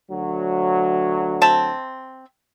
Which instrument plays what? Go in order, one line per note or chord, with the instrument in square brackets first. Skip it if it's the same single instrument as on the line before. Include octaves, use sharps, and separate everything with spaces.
[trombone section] D2 F#3
[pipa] C4 E5 A5